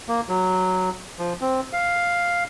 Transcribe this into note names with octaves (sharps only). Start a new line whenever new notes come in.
A#3
F#3
F3
C4
F5